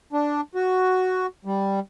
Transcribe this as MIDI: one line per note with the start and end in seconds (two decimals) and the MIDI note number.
0.13 0.41 62
0.55 1.26 66
1.45 1.80 55